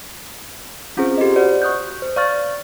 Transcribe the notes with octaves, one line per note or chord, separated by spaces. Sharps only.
C4 C#4 F4 G#4 C5
G4 A4 C5 D#5
F#4 C5 D5 D#5 F#5
C#6 D#6 F#6 G6
C5
D5 F5 C#6 F6 A6